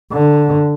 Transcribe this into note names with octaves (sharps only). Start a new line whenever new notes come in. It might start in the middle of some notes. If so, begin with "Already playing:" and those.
D3